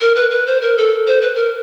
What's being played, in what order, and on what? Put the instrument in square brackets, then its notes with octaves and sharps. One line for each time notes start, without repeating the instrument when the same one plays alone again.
[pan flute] A#4
B4
B4
C5
A#4
A4
C5
B4
A#4